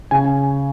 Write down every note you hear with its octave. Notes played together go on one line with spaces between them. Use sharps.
C#3 G#5